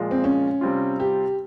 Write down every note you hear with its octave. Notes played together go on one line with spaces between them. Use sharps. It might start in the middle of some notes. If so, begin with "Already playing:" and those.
Already playing: A#2 F3 G#3
C4
C#4
C3 G3 C4 F4
G4